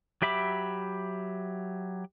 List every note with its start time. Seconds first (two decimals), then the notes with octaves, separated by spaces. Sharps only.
0.22 F#3 G4 E5 B5 D6